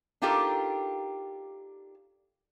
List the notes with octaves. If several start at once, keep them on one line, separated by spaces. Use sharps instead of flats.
D4 D#4 F4 G4 A4 A#4